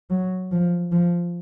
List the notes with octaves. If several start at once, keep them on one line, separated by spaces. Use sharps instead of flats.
F#3
F3
F3